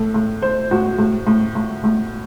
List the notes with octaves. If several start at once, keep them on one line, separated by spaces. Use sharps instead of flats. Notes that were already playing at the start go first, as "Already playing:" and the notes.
Already playing: A2 A4
A2
A2 C5
A2 F#4
A2
A2
A2
A2